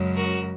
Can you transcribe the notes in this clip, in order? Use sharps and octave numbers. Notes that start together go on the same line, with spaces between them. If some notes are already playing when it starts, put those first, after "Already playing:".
Already playing: F#2 C#3 G#3
F#4 A#4